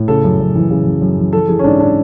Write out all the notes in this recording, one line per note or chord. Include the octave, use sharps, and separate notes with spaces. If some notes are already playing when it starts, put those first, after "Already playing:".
Already playing: A2
C#3 A4
F#2
F#2
E3
C#3
F#2
F#2
E3
E3 A4
E3 G#4
C#4
G#2 D4
D4